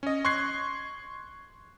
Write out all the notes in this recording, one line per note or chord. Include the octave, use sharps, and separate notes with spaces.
C#4 D#5
C6 C#6 F#6 G#6 C7